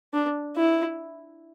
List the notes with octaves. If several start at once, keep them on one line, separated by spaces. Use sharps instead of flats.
D4
E4